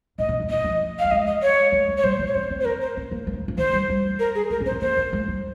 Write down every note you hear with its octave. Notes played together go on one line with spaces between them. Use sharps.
G#2 D#5
C3
D#3
F3 D#5
F3
F5
G3
G#3 D#5
D#5
C#5
G#3
A#3
C#5
G3 C5
F3
C#5
C4 C5
C4
C5
A#4
C5
C4
A#3
G#3
F3
G3
F3
D#3 C5
G3
G3
A#4
G#4
G#3 A#4
C4
C5
C4
A#3 C5
A#3
G#3
G3